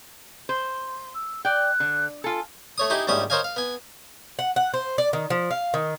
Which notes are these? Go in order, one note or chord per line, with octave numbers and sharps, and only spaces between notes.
C5
E6
D5 G5 F#6
D3
F4 A4 G#5
A3 C#5 D#6
D#4 E4 G4 G#4
A#1 G#2 G3 C#4 E5 D#6
A#4 C5 C#5 D#5 F5 G#5
F5
B3 G#5
F#5
F#5
C5
D5
D#3
F3
F5
D#3